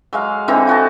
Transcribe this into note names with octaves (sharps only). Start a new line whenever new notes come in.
F#3 G#3 F5
D3 E3 C4 D#4
F4 F#4 D#5 A5